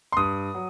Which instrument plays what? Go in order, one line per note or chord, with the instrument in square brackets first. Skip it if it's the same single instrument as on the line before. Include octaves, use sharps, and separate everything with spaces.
[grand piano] C6
G2 D#6
F#3